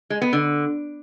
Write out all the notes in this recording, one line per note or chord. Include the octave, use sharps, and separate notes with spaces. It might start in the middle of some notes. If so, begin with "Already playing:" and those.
G#3
B3
D3